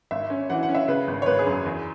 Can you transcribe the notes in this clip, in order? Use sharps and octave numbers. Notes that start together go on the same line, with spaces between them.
G#1 E5
C#4
E3 F#5
F#5
C#4
E5
C#3 B4
G#1
C#5
G#1 B4
G#4
F#2
G#4
E2